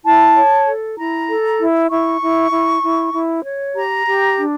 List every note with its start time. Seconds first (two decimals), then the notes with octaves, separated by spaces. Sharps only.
0.04 E4 A5
0.35 C#5
0.66 A4
0.98 E4 A#5
1.28 A4
1.60 E4
1.89 E4 C#6
2.21 E4
2.51 E4
2.82 E4
3.13 E4
3.45 C#5
3.75 G4 A#5
4.06 G4
4.37 D4